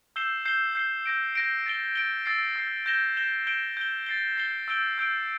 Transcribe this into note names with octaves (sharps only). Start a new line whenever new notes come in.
E6 G6 C7 E7 G7
G6 C7 G7
G6 C7 G7
G6 A#6 D7
G6 A#6 D7
A6 D7 G7
A6 D7 G7
E6 A6 C7
E6 A6 C7
G6 A#6 E7 G7
G6 A#6 E7 G7
G6 D7 G7
G6 D7 G7
A6 C7 G7
A6 C7 G7
E6 G6 D7 G7
E6 G6 D7 G7